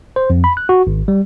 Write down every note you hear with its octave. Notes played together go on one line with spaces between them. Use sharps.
C5
F2
B5
F#6
F#4
G#1
G3